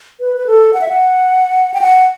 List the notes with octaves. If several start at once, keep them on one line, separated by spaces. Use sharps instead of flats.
B4
B4
A4
F#5
E5
F#5
G5
F#5